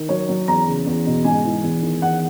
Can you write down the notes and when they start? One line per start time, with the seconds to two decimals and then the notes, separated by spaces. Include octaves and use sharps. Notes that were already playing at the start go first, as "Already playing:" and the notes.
Already playing: D#3
0.09 F#3 C#5
0.29 F#3
0.48 E2 A#5
0.67 C#3
0.86 E2
1.06 B2
1.24 G#2 G#5
1.44 E3
1.63 E2
1.82 D#3
2.01 E2 F#5